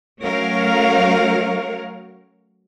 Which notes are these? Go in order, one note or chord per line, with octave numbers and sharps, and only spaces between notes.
F#3 A3 C#4 A#4 C#5 F5